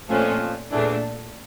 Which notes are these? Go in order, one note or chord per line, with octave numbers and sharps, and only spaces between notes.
F2 A#2 F3 A3 C#4
E2 A#2 E3 A3 D4